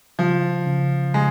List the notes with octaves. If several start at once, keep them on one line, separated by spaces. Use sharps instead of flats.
C#3 F3
C#3
C#3 G#3